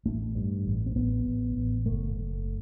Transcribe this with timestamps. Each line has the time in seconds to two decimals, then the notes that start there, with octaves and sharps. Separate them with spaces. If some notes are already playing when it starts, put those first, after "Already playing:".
0.06 A1 A3
0.35 G2
0.66 A1
0.86 C4
0.95 A1 B3
1.26 A1
1.56 A1
1.85 F#1 A3
2.16 F#1